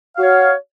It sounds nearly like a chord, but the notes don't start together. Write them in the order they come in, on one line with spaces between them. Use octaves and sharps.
F5 F#4 C#5